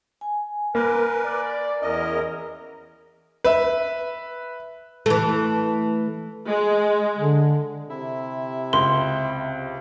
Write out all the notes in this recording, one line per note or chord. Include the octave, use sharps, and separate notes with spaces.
G#5
A#3 A#4 B4
D5
E2 C#4 E4 A#4 D#5
B4 E5
E3 A3
G#3
D3
C3 E4 E5
C#2 C6